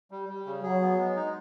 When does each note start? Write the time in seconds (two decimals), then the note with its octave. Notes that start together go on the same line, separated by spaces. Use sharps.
0.11 G3
0.29 G3
0.46 C#3
0.63 F#3 G#4
0.81 B3
0.99 G#3
1.16 D#4